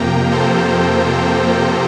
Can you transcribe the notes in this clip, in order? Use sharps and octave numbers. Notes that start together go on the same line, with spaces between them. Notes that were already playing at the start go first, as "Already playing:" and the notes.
Already playing: F2 C3 F3 A#3 G5 A#5
A4 C5